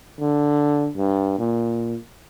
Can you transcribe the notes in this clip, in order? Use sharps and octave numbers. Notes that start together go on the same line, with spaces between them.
D3
G2
A#2